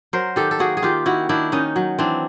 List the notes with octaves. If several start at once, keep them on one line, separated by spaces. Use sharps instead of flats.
F#3 A#4 C5
D#3 G4 A4
A4
A#3 F#4 G#4
G#4
D#3 F4 G4
D#3 E4 F#4
D#3 D4 E4
D#3 C#4 D#4
F#3
E3 C4 D4